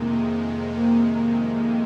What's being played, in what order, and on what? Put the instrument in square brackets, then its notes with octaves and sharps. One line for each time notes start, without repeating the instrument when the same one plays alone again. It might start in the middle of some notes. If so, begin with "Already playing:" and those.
Already playing: [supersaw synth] F2 C3 D#3 G#3 [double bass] A#3
[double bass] A#3
A#3
A#3